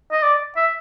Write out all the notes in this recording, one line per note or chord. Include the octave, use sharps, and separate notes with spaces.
D#5
D5
E5